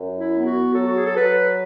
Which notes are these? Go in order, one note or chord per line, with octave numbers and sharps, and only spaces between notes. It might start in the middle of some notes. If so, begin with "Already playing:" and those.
Already playing: F#2
E4
B3
F#4
F#3 A4
F#4
G#4
A4
F#3 B4